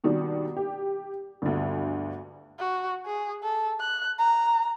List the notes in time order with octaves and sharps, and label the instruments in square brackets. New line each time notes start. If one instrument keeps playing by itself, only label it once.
[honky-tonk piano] B2 D#3 G3 D4
G4
G1 D2
[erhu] F#4
G#4
A4
F#6
A#5